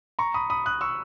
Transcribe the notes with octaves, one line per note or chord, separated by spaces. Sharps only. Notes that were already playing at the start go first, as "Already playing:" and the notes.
A#5 C#6
B5 D#6
B5 D#6
D#6 F#6
C#6 E6